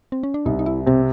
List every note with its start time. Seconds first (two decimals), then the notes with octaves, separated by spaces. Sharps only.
0.12 C4
0.23 C#4
0.34 D4
0.45 C2 D#4
0.59 D#4
0.66 E4
0.86 C3 C4